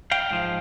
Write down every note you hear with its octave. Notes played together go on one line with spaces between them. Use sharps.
F5 G5
G#2 F3